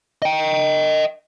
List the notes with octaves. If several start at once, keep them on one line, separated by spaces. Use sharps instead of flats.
D#5 G5